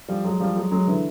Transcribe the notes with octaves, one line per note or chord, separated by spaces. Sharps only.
F3 G3
F#3 G#3
F3 G3
F#3 G#3
F#3 G#3
D3 E3